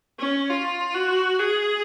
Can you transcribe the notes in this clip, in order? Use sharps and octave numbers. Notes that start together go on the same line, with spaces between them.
C#4
F4
F#4
G#4